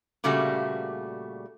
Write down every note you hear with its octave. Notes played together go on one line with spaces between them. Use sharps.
A#2 C#3 G3 A3 A#3 F#4